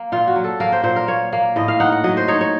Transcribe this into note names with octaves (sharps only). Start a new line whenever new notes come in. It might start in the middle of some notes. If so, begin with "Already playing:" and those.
Already playing: A#3
A#2 F4
F#4
F#3
A4
A#3 A#4
C5
A#2 C5
A#4
A#3 C#5
A#3
A2 D#5
F5
D#4 F#5
F#5
F#3 D#5
C5
D#4 C#5
C#5